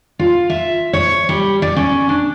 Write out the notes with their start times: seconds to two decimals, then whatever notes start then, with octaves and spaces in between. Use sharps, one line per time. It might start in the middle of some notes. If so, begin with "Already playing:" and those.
0.19 F4
0.50 E5
0.93 C#5
1.29 G3
1.62 D5
1.77 C#4
2.09 D4